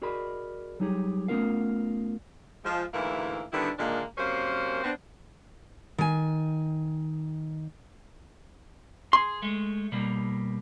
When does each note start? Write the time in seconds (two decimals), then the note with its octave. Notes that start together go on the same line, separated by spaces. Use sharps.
0.02 F#4 G#4 A#4 D5 D#5 B5
0.80 F#3 G3 D#4 G4 G#4
1.28 A3 B3 C#4 F4 A#4 F5
2.64 F3 G#3
2.94 D2 G#2 E3 A#3 E4
3.52 D3 D#3 G3 B3 D4 E4
3.78 A#2 D3 D#3 G#3 A#3 D4
4.18 F#2 C3 A#3 C#4 C5
4.84 B3 C4 D4
5.98 D#3 G#5
9.13 G#4 C6
9.42 G#3 A3
9.92 B2 G3 A#3